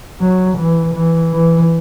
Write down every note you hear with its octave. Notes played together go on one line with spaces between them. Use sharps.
F#3
E3
E3
E3